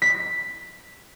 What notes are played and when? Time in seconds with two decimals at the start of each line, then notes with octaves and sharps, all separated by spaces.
0.02 B6